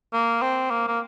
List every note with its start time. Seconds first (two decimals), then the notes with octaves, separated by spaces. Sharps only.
0.13 A#3
0.42 C4
0.70 A#3
0.88 A#3